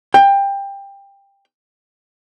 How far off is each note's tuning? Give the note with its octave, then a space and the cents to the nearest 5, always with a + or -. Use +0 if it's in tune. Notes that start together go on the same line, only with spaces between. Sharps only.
G5 +20